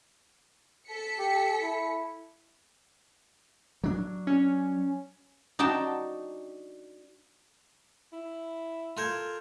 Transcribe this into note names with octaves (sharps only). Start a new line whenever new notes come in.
A4 B6 C#7
G4
E4
F#3 D4
C#4
D4 D#4 F#4 G5 A5
E4
F4 A4 A#4 C6 G6 G#6